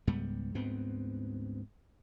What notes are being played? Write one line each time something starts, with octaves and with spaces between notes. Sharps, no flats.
C#2 G#2 G3 B3
D2 G#2 B3 C4